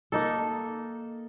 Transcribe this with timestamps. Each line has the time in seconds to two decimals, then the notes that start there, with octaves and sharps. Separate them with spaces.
0.12 A#3 D#4 A4